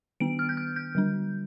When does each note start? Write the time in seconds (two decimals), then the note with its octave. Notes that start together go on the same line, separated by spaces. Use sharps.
0.20 D#3 B3 D4 D7
0.39 F6
0.49 G6
0.57 F6
0.76 G6
0.95 D3 G3 D4